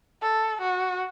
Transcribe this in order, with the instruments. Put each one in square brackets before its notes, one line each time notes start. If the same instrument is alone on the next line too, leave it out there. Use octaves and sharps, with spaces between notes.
[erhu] A4
F#4